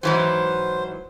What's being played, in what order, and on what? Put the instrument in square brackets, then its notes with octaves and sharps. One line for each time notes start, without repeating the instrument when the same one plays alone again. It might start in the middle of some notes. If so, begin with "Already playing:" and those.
[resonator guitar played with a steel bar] G#2 E3 F#3 [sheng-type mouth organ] C5